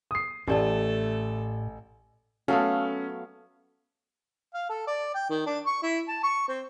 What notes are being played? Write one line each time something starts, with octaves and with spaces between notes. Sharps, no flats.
D#6 C7
A1 A2 A3 G4 A4 D5 A5
F#3 A3 B3 C#4 A4 F5
F5
A4
D5
G5
D#3
D4
C#6
E4
A5
C#6
C4